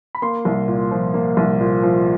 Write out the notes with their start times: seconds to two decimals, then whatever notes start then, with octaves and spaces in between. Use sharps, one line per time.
0.15 B5
0.22 A#3 C6
0.45 C2
0.68 A#2
0.91 F3
1.14 A#3
1.37 C2
1.60 A#2
1.83 F3